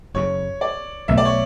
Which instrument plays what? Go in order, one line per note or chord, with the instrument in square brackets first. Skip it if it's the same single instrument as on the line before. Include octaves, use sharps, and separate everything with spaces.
[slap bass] F#1 F#2 C#3 [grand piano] C#5
[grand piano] D5
[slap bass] B1 B2 A3 [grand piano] E5
[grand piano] D5
C#5